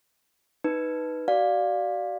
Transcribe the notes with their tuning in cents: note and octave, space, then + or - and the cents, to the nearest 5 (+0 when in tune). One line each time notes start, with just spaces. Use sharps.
D#4 +0 B4 +0
F#4 +40 D5 +0 F5 +10